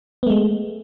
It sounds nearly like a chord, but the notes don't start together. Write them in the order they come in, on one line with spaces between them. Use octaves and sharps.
B3 A3 G#3